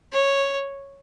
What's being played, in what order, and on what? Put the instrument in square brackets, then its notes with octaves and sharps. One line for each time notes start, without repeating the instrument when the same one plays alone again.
[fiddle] C#5